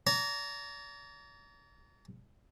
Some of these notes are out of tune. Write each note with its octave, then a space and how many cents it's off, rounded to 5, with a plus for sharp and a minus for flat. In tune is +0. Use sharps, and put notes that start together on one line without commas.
D5 -45 A#5 -15